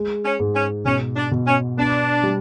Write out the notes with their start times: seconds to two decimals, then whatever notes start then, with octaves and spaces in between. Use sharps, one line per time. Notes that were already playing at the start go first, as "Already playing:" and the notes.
Already playing: G#3
0.24 C#4
0.40 G#2
0.55 C#4
0.85 B2 C#4
1.16 D4
1.32 B2
1.46 C#4
1.78 B3 D4
2.23 G3